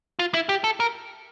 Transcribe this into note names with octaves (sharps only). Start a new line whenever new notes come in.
F4
E4
G4
A4
A#4